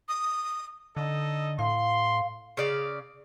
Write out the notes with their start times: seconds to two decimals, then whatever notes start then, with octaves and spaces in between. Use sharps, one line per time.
0.09 D#6
0.97 D3 D#4 A4 D#5
1.59 A2 F5 C6
2.57 C#3 D5 F5